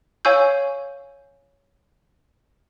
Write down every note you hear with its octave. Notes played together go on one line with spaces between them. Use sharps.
C#5 F5 G#5 C#6 E6 G6